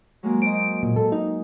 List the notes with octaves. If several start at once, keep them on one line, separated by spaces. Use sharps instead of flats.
F#3 G#3 A#3
C5 D#5 D7
A#2
A4
D#4